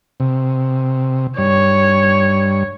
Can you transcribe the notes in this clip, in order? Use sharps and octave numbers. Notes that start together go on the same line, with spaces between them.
C3
G2 C#5